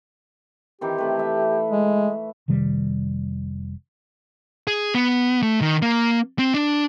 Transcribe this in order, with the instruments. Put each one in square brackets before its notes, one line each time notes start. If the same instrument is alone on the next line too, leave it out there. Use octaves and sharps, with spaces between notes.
[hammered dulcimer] D#3 E3 C4 [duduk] G4
[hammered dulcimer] C3 A3 B4
B4 E5 A5
[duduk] G#3
[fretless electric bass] F1 C3 D#3 G3
[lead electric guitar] G#4
B3
A3
D#3
A#3
C4
D4